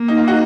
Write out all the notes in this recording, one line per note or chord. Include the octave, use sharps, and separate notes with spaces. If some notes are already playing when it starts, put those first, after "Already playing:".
Already playing: A#3
D#4
F4
D#4 F#4